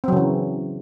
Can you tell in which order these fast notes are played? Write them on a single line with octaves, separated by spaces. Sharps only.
C4 F#3 C#3 E3